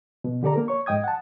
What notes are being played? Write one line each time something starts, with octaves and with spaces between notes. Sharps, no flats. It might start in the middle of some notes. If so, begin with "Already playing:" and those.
B2
D3 G4 A4 D5 A#5
A#3 A#4
C#5 C#6
G#2 D#5 G5 D#6 G#6
F#5 A5